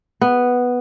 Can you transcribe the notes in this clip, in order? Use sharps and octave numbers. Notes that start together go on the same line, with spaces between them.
B3